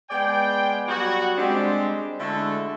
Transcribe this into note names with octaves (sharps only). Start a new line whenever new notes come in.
G#3 B3 D5 G5
F#3 G3 B3 F#4
G3 G#3 C4 D4 G4
D3 G#3 A3 E4 F#4 A4